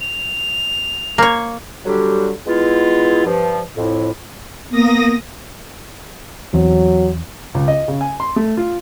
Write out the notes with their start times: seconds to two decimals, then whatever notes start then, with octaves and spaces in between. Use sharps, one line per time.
0.01 F7
1.18 A#3 C#5
1.86 D3 F#3 G3 G4
2.47 G#3 B3 E4 F4
3.25 G2 F3
3.76 F2 A2
4.71 A#3 B3 D#6 A#6
6.54 E2 E3 F#3 C4
7.55 C#2
7.68 D#5
7.88 C#3
8.01 G#5
8.20 C6
8.36 A3
8.57 F4